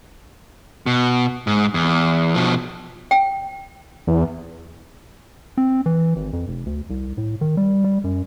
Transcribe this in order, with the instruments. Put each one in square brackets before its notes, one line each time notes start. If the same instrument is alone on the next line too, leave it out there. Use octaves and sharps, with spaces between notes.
[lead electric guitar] B2
G#2
E2
B2 F3
[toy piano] G5
[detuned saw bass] E2
[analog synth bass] C4
E3
G#1
F2
F1
D2
C2
A2
D#3
G3
G3
F#2